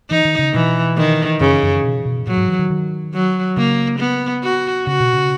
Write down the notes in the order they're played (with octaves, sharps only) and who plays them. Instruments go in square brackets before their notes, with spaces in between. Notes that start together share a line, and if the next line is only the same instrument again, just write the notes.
[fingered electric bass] E3 [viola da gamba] D#4
[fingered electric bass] D#3
C#3
[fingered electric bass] B2 [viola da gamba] E3
[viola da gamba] D#3
[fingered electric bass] F#2 [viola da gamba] C#3
[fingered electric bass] F#2
B2
B2
[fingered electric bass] A#2 [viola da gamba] F#3
[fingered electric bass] G#2
E3
D#3
D#3
[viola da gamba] F#3
[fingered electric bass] C#3 [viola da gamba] A#3
[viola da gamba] B3
F#4
[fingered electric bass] C#3 [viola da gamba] F#4
[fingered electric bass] B2
C#3